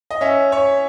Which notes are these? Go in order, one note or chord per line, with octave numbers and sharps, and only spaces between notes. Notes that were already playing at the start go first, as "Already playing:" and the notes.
D#5
C#4 E5
C#5